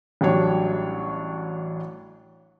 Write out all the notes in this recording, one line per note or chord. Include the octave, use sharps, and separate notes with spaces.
A1 F#3 G3 D4 C#5